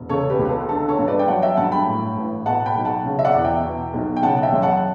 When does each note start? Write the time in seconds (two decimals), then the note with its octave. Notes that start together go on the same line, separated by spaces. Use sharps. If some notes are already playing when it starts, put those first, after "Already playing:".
Already playing: E1
0.09 C#3 A4 C#5
0.30 G4 B4
0.39 C#2
0.45 B4
0.49 A4
0.69 D3 A4
0.88 A4 C#5
0.98 G2
1.08 B4 D5
1.19 G5
1.28 F#3 F#5 A5
1.42 E5 G5
1.57 G2 F#5 A5
1.72 G5 B5
1.87 A2
2.17 A1
2.46 B2 F#5 A5
2.66 G5 B5
2.76 B1
2.85 F#5 A5
3.05 C#3
3.19 E5
3.24 D5 F#5
3.35 E2
3.44 E5 G5
3.65 B2
3.94 B1
4.17 G5
4.23 C#3 F#5 A5
4.43 E5 G5
4.52 F#2
4.62 F#5 A5